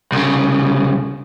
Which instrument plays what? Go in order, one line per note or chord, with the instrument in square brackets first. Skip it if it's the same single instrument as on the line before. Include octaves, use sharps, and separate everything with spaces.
[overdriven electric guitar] C2 C#3